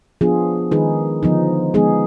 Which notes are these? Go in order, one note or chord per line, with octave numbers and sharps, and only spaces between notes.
F3 B3 D4 F4 G#4
D#3 G#3 D#4 G#4 B4
D3 F3 B3 D#4
F3 G#3 B3 D#4 G#4